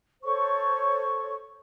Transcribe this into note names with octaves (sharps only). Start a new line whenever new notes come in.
A4 C5 C#5 C#6